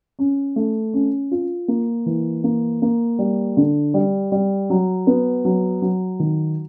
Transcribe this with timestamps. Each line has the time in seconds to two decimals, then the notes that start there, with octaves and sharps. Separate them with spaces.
0.19 C#4
0.56 A3
0.94 C#4
1.31 F4
1.68 A#3
2.06 E3
2.44 A#3
2.82 A#3
3.19 G3
3.57 D3
3.94 G3
4.32 G3
4.70 F#3
5.07 B3
5.45 F#3
5.82 F#3
6.19 D#3